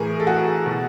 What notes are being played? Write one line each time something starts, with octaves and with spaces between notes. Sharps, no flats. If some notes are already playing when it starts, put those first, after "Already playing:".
Already playing: A2 E3 G#4 A#4
A4
F#4 G#4
B2